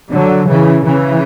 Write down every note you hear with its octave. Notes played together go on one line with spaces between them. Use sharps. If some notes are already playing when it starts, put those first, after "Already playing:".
D3 F#3
C#3 E3
C#3 E3